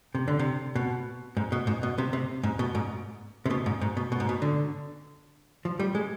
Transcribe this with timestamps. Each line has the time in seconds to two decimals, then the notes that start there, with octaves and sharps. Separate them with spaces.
0.15 C3
0.28 D3
0.39 C3
0.75 B2
1.37 G#2
1.52 B2
1.67 G#2
1.83 B2
1.98 C3
2.13 C3
2.44 G#2
2.59 B2
2.75 G#2
3.46 C3
3.51 B2
3.66 G#2
3.81 G#2
3.97 B2
4.12 B2
4.20 G#2
4.29 B2
4.42 D3
5.65 F3
5.80 G3
5.95 G#3